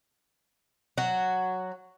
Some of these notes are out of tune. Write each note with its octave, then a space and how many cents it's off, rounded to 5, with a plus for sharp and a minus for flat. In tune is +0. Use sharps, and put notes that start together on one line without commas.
F#3 +0 F#4 +0